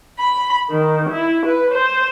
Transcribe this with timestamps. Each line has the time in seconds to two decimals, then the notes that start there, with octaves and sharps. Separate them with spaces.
0.18 B5
0.71 D#3
1.10 E4
1.46 B4
1.74 C5